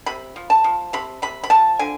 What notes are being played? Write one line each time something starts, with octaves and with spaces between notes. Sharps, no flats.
C3 B5
F3
A5
F3
C3 B5
C3 B5
B5
F3 A5
D3 G#5